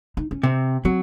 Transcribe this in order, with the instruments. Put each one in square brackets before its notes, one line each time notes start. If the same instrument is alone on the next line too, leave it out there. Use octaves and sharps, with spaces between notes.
[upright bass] D#4
C#4
[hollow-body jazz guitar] C3 [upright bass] C4
[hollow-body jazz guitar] F#3 [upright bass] C4